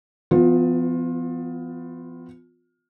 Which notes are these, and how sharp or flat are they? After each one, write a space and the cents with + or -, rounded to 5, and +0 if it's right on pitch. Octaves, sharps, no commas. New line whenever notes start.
F3 -40 B3 +30 F4 +25